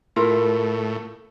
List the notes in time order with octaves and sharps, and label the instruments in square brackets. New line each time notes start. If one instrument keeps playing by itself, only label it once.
[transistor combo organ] A2 [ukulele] E4 F4 A#4